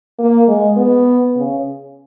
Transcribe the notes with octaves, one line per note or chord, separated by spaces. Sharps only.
A#3
G#3
B3
C#3